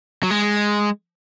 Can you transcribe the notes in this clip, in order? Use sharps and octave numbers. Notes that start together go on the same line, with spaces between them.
F#3
G#3